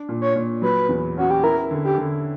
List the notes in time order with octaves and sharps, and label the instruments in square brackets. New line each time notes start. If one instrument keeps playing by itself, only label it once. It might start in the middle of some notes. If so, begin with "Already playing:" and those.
Already playing: [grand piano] D4
A#2
[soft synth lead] C#5
[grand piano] A#2
[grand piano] F#3 [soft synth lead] B4
[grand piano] E2
[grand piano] C#4 [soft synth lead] F#4
[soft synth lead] G4
[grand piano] E4 [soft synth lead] A#4
[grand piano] D3
[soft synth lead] G4
[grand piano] D3